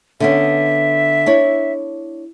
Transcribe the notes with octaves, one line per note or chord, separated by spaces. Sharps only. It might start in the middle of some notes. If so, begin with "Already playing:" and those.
D3 B3 C#4 E5
D4 E4 C#5